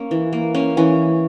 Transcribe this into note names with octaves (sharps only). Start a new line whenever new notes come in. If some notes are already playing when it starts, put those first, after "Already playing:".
Already playing: A#3 C#4
E3
A#3
A#3 C#4
E3 C#4